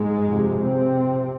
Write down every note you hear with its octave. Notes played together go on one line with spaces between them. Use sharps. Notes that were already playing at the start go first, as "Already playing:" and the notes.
Already playing: G#2 G#3
F2 C3
C3 C4